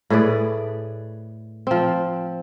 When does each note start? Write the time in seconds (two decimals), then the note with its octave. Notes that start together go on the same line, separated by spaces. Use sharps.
0.10 A2 G#4 B4 D5
1.67 F3 C4